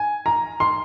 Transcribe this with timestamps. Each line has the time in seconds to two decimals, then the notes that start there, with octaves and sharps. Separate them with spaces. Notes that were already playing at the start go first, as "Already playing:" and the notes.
Already playing: G#5
0.26 A#5
0.60 C6